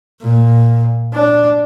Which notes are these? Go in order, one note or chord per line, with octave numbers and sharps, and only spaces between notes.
A#2
D4